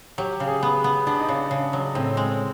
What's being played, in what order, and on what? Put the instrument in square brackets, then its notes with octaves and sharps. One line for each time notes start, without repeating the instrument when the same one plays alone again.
[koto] F#3 [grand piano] G4
[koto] C#3
[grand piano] G#4
[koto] B3
B3
[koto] B3 [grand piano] D4
[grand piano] D#4
[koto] C#3 [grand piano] D4
[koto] C#3
F#3
[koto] A2 [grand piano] C4
[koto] G#3